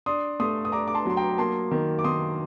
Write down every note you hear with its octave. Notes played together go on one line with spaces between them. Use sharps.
D4 C6 D#6
A3 C6 D#6
D#6
D4 A#5 D6
D6
A5 C6
F#3 C6
G5 A#5
A#3 A5 C6
D#3
D6
D#3 C6 D#6